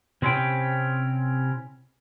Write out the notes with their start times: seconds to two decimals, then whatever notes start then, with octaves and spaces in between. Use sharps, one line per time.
0.22 C3 C4 C#4 E4 G5